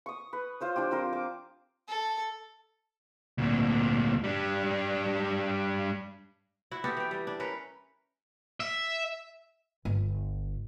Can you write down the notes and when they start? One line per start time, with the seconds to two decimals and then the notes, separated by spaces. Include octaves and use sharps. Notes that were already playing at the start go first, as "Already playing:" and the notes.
0.06 C#6 D#6
0.33 B4
0.60 F4 C5 C#5
0.76 F3 D4 F4 G4
0.91 C4 F4 A#4 C5
1.13 D6
1.88 A4
3.38 D2 A#2
4.24 G3 D4
6.71 E4 F#4
6.84 B3 F#4 G4 A4
6.97 E3 G5
7.11 G3
7.27 D4
7.40 C#4 A#4 B4
8.60 E5
9.85 G1